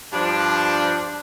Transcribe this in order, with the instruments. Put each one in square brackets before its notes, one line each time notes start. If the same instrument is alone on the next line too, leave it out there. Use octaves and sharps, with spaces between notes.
[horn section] G2 F3 D4